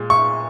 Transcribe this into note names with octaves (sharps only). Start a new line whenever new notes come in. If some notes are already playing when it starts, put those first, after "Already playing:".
Already playing: A#2 G#3
C#6